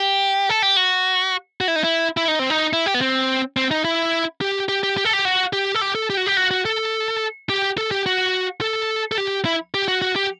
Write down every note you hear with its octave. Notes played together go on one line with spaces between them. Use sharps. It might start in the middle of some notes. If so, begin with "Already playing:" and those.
Already playing: G4
A4
G4
F#4
F#4
E4
D#4
E4
E4
D#4
C4
D#4
E4
G4
B3
C4
C4
D#4
E4
G4
G4
G4
G4
A4
G4
F#4
G4
A4
G4
A4
G4
F#4
G4
F#4
F#4
A4
G4
A4
G4
F#4
A4
A4
G4
E4
G4
F#4
F#4
G4